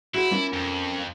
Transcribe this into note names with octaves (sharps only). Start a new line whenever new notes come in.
E4 F#4 G#4 C5
A#3 C#4 F4
F2